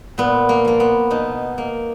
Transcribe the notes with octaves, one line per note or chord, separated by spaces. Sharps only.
A#2 B3
A#3
F3 A#3
B3
B2 D#4
A#3